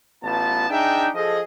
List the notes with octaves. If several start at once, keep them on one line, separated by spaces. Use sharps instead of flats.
A1 B3 F4 A5
D4 D#4 G#4 E5 G5
F3 G#4 A4 D#5